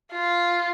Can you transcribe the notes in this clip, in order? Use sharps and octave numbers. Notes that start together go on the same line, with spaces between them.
F4